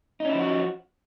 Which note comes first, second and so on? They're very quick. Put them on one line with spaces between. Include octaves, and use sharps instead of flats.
D#4 C#4 E4 F3 F#4